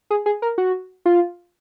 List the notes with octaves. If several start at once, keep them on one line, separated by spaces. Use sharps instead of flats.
G#4
G#4
A#4
F#4
F4